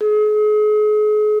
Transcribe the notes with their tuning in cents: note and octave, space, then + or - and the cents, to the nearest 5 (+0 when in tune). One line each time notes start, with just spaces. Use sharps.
G#4 +40